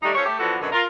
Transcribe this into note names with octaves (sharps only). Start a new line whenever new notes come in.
D#3 G3 A3 D4 D#4
C#4 F4 A4 C5 C#5
A3 G4
E3 F3 B3 D4 F#4 A4
F#2 B2 D3
F4 A#4